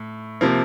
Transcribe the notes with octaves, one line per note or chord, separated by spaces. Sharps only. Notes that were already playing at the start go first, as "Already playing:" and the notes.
Already playing: A2
C3 F3 A#3